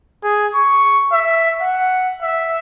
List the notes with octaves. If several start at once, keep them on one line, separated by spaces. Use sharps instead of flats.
G#4
C#6
E5
F#5
E5